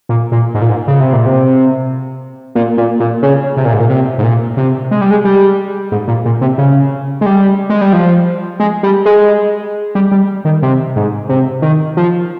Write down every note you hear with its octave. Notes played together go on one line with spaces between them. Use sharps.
A#2
A#2
G#2
A#2
G#2
C#3
C3
A#2
C3
A#2
A#2
A#2
C#3
C3
A#2
G#2
A#2
C3
G#2
A#2
C3
G#3
G3
G#3
G3
G#2
A#2
A#2
C3
C#3
G#3
G3
G#3
G3
F3
G#3
G3
G#3
G3
G3
D#3
C3
G#2
C3
D#3
F3